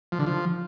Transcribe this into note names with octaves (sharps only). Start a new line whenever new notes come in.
F3
D3
F3